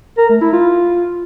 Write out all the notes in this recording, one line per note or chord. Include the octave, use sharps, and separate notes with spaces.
A#4
A3
E4
F4